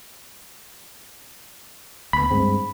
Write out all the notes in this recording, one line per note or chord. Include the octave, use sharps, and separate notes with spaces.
D2 B3 B5
G2 G#3 C4